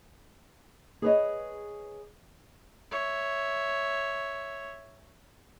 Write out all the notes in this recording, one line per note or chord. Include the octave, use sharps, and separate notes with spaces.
G#4 B4 C#5 D#5
C#5 E5